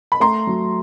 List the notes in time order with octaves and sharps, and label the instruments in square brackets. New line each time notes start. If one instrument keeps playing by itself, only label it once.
[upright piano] B5
[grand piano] A3 [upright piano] A#5 C6
[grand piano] F#3